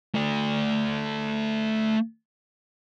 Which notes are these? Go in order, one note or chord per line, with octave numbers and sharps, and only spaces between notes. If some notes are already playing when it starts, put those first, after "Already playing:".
A3 D5